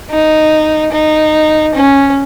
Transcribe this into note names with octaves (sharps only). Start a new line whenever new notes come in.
D#4
D#4
C#4